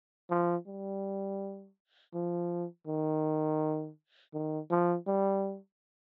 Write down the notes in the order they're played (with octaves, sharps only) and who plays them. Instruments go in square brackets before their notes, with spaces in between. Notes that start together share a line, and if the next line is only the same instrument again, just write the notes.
[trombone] F3
G3
F3
D#3
D#3
F3
G3